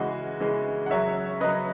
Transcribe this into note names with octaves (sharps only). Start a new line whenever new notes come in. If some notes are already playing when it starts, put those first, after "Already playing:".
Already playing: C#3 E3 G#3 F#4
C#3 E3 G#3
F#5
C#3 F#3 C#5 E5
C#3 F#3 B4 D#5